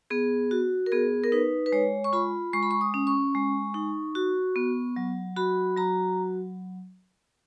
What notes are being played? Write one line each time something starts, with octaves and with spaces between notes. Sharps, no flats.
B3 G#4
F#4
A#4
B3 G#4
A#4
D#4 B4
B4
G#3 C#5
C#6
F4 B5
G#3 C#6
B5
C#6
D#6
C#4
C#6
G#3
D#4
F#4
B3
F#3
F#4 B5
F#3 A#5